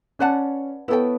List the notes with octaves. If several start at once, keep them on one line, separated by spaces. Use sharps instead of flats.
C#4 B4 D5 F#5 A5
B3 E4 A4 C#5 G5